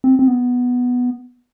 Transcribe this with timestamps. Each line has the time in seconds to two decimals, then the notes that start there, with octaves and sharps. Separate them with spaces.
0.04 C4
0.19 C4
0.28 B3